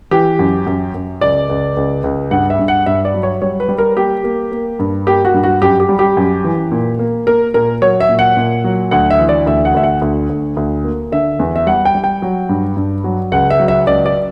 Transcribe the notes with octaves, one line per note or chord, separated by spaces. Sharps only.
E3 G4
F#2
F#2
F#2
C#2 D5
C#2
C#2
C#2
G2 F#5
E5
G2
F#5
G2 E5
D5
F#3
C#5
G3 C#5
B4
G3
A#4
A#3 G4
A#3
A#3
G2
A#3 G4
F#4
G2
F#4
F#2 G4
G4
G3
G4
F#2
E3
A#2
A#3
A#3 A#4
A#2 A#4
F#3 C#5
E5
A#2
F#5
A#2
F#3
D2 F#5
E5
E3
D5
D2 E5
F#5
D2 E5
F#5
D2
D2
D2
A#3
D3 E5
E2
E5
G3 F#5
G5
G3
G5
F#3
G2
G2
F#3
C#2 F#5
E5
F#3
E5
C#2 D5
D5